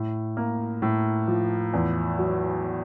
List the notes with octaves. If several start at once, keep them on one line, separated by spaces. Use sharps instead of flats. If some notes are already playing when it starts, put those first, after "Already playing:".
Already playing: A2
A#3
A2
F3
E2
F#3